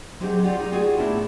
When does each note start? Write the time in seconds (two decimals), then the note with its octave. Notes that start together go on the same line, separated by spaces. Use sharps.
0.20 F#3 C4 D#4 G4 G#4 C5
0.43 F4 G4 D5 F#5
0.60 D#4
0.72 C4 F4 F#4 G#4 D5
0.97 A2 B3 D4 E4